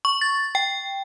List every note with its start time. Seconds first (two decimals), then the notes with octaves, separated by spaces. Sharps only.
0.05 C#6
0.21 A6
0.55 G5